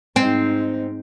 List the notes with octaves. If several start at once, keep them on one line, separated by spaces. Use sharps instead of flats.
G#2 C4 D#4